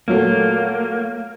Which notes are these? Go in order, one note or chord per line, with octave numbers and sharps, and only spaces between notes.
A#2 F#3 A3 A#3